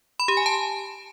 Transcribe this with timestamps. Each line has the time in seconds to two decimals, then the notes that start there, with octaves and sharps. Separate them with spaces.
0.20 B5
0.28 G4
0.37 G#5
0.46 A5